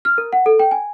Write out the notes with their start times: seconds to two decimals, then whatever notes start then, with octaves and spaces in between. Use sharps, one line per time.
0.05 F6
0.18 A#4
0.33 F#5
0.46 A4
0.59 G5
0.71 G#5